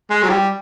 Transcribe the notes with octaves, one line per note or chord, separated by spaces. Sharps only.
G#3
F#3
G3